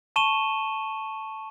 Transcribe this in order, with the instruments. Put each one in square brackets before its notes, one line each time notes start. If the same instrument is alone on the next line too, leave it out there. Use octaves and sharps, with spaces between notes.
[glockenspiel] A5 C#6 D#7 E7 G7